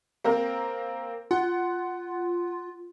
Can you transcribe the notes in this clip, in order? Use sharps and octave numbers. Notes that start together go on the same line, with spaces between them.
A#3 C4 A#4
F4 F#5